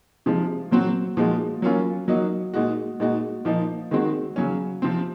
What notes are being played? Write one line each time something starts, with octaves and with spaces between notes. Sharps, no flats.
C3 F3 G#3
A#2 F#3 C4 F#4
A#2 F3 G#3 D#4 F#4
F#3 A#3 C#4 F4
F#3 A#3 D#4 F#4
A#2 G#3 D#4 F#4
A#2 G#3 D#4 F#4
A#2 F3 A#3 D#4
D#3 G#3 C4 F#4
C#3 F#3 C#4
C3 F3 C4